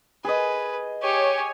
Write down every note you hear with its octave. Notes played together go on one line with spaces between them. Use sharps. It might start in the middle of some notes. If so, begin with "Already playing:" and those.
G#4 B4 D#5
G4 C#5 G#5